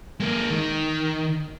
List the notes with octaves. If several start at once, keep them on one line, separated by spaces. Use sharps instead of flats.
G#3 A#3
D#3